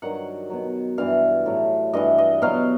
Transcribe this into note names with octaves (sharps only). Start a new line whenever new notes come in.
G2 D#3 F#3 F#5
B2 F#3
G2 E3 F5
A2 F#3
G2 E3 D#5
D#5
B2 F#3 F5